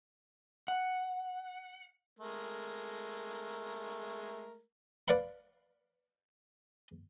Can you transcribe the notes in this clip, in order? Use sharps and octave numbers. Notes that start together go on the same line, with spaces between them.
F#5
G#3 A3 A#4
B4 D5 F5 F#5 B5